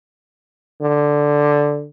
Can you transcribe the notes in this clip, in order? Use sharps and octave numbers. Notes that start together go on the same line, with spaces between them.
D3